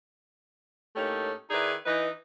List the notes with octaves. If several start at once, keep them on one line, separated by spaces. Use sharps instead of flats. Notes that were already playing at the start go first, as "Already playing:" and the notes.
A2 A3 A#3 C#4 D#4 G4
D#3 D#4 E4 G#4 B4 D5
E3 D#4 B4